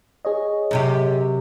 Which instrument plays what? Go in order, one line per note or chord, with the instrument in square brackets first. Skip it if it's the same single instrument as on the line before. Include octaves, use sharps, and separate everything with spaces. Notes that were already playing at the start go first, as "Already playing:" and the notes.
[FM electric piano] G#4 C#5 D#5
[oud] F#2 C3 G4